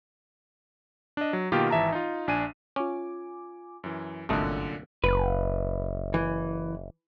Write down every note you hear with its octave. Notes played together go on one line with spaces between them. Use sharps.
D4 D#5
F#3
B2 D#3 A#3 F4 G4
G#1 E3 E5 A5 A#5
D#4 F4
A#1 D4 G#5 D#7
C#4 F4 G#5 D6
F#2 E3
G1 C2 F#2 A#2 D3 A3 D#5 F#6
F#1 B4
E3